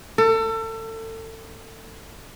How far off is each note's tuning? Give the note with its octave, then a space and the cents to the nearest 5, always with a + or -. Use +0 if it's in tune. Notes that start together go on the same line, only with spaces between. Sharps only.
A4 +30